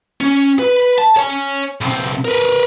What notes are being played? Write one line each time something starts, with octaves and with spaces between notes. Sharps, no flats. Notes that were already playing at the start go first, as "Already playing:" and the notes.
C#4
B4
A5
C#5 G#5
B1 C4
A#4 B4